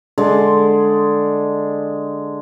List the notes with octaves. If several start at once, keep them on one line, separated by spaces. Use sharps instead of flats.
D3 G#3 D5